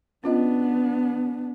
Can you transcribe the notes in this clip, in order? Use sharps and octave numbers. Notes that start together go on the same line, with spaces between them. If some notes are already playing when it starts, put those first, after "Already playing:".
B3 C#4 D4 F4 D#5